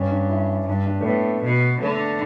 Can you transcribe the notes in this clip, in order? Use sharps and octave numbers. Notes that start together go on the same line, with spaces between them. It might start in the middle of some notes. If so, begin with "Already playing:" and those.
Already playing: G2 C#4
D4
E4
G2 D4
D4
A3
A2 B3
B2
D3 A3